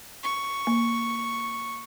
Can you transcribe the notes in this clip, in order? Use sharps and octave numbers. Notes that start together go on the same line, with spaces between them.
C#6
A#3